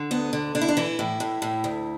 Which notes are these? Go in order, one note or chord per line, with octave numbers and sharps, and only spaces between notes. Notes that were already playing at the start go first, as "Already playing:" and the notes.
Already playing: D3
D2 B3
D3
D3 D4
E4
D4
E3 E4
A2
A2
A2
D2